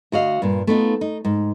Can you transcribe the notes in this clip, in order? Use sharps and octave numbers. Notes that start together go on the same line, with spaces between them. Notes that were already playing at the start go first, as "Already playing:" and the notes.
D2 F#4 D#5 F5
G2 A#2
A3 B3 D#4 F4
D#4
G#2